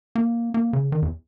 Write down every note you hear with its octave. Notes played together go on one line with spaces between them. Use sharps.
A#3
A#3
C#3
D#3
E2